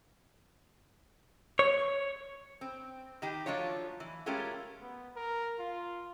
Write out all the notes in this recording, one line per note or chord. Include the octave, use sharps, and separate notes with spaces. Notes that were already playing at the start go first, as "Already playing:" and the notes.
C#5
C4
D#3 D#4 G4
F3 F#3 A3 D4 F4 C#5
E3
G#3 A3 C#4 F4 G4 A#4
B3
A#4
F4